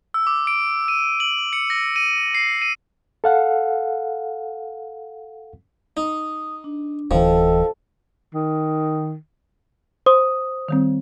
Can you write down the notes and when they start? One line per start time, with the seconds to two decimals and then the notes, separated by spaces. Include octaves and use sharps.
0.14 E6
0.27 D6
0.47 D7
0.88 D#7
1.20 F#7
1.53 C#7
1.70 A#6
1.96 D#7
2.35 C7
2.62 D#7
3.24 A4 F5 F#5
5.97 D#4 D#6
6.64 D4
7.11 D1 E3 F3 A4 D#5 G5
8.34 D#3
10.06 C5 D#6
10.69 D#3 G3 C4